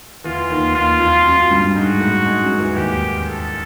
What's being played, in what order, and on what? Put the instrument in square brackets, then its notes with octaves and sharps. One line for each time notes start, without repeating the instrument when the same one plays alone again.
[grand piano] E2 E3 [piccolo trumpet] F4
[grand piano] D#2 D#3
[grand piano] D#2 D#3 [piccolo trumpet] F4
[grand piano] F2 F3
F#2 F#3
G2 G3
[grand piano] G#2 G#3 [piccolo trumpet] F#4
[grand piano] A2 A3
G#2 G#3
F#2 F#3
E2 E3
[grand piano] D#2 D#3 [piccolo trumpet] G4
[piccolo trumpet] A4